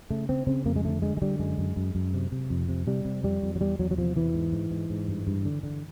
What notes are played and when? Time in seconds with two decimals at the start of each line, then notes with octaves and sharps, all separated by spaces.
0.10 C#3 A3
0.29 C#3 C4
0.47 C#3 C4
0.65 F2 A#3
0.76 G#3
0.85 D3 A3
1.02 D3 G#3
1.17 G#3
1.22 D3 G3
1.39 F#2 G#3
1.58 F#2
1.76 F#2
1.95 F#2
2.14 C3
2.32 C3
2.50 F2
2.69 C3
2.87 C3 G3
3.05 C3
3.24 F2 G3
3.42 F2
3.56 F#3
3.60 E2 G3
3.79 E2 F#3
3.91 F#3
3.98 C3 F3
4.16 E2 E3
4.34 G#2
4.53 G#2
4.71 G#2
4.90 G#2
5.08 G2
5.27 G2
5.45 D3
5.63 D3